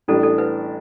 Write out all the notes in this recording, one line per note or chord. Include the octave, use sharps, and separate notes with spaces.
A1 A2 G3 D4 A4
A4
B4